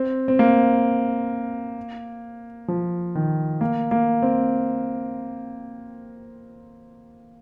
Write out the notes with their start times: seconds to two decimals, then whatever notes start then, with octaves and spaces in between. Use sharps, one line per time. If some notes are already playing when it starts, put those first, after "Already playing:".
Already playing: C4
0.28 C4
0.39 A#3
2.68 F3
3.15 D#3
3.61 A#3
3.91 A#3
4.22 C4